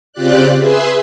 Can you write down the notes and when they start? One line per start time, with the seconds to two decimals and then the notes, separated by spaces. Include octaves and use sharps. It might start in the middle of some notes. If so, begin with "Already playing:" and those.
0.13 C#3 C4 F4 G4 D5 F#6
0.57 G#4 B4 E5 C6